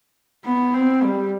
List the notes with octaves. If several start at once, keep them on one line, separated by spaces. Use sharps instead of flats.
B3
C4
G3